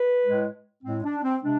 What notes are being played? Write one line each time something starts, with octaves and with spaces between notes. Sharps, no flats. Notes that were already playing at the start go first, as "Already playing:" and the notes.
Already playing: B4
A2 G#3
A2 G#3 C4
D4
C4
C3 G#3 D4